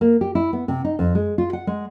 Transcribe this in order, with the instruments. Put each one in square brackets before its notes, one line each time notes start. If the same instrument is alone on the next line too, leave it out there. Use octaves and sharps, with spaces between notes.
[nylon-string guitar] A#3
G4
E4
B3
C3
D#4
F2
G#3
F4
F#5
G#3